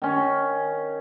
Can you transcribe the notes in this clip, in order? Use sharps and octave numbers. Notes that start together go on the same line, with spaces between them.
D#3 C#4